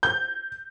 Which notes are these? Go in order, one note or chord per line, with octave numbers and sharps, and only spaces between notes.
G6